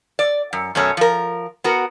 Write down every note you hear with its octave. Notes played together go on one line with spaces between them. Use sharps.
D5
F#2
F#2 B2 A3 C#4
F3 A#4
B3 F#4 A#4